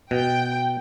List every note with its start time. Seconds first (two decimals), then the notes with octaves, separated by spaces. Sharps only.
0.11 B2 G5